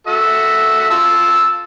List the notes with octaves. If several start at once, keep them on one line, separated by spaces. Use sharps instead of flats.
F#4 A4 E5
F4 A5 E6